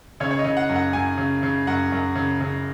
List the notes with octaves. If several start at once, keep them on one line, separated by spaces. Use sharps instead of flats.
C#3 C#5
C#5
D#5
C#3
F#5
F#2
F#5
F#2 G#5
C#3
C#3
F#2 F#5
F#2
C#3
C#3